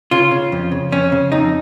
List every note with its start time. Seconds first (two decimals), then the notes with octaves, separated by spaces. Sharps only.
0.11 C#3 F4
0.31 C#3
0.52 F2
0.71 C#3
0.92 F2 C#4
1.12 C#3
1.32 F2 D#4